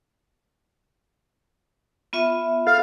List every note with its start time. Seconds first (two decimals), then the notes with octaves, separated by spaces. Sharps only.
2.13 B3 F4 E5
2.67 A4 F5 F6